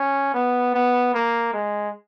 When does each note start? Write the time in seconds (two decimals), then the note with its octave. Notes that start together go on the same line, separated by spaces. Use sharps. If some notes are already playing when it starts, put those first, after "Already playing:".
Already playing: C#4
0.34 B3
0.74 B3
1.14 A#3
1.53 G#3